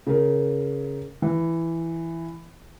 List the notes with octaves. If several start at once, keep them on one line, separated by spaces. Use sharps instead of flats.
C#3 A#4
E3